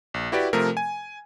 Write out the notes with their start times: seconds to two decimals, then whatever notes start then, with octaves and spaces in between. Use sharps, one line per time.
0.14 A#1
0.32 E4 F#4 G4 B4 D5
0.53 C3 F3 A3 A#4
0.77 G#5